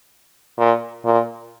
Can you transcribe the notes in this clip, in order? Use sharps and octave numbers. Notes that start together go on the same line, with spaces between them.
A#2
A#2